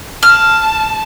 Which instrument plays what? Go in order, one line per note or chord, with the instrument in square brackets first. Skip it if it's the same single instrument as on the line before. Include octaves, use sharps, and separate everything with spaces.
[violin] A5 [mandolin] F6